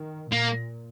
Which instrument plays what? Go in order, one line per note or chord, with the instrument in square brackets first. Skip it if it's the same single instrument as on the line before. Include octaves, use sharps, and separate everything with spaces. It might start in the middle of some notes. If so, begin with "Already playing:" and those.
Already playing: [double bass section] D#3
[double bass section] A#2 [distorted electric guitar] A#3